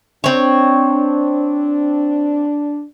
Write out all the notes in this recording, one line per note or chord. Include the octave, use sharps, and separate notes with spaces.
C4 D4 C#5